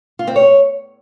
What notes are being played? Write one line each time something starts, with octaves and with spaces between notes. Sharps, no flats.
F4
C4
C#5